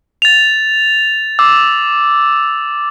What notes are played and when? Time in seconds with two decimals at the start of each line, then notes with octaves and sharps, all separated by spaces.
0.22 A6 F7
1.39 D6 E6